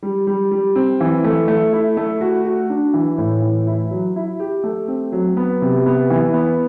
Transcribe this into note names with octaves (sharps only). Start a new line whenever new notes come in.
G3
G3
G3
C4
E3
A3
A3
E4
A3
F#4
F#4
D4
E3
A2
E3
E4
F#3
E4
G4
A3
C4
F#3
B3
C3
B3
E3
B3